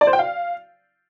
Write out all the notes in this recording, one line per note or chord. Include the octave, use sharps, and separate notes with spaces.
D5
C5
G5
F5